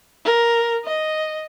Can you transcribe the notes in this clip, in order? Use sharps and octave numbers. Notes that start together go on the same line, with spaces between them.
A#4
D#5